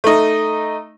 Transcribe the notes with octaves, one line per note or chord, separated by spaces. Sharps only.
A3 D#4